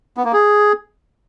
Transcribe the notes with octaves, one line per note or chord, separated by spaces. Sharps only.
B3
A#3
G#4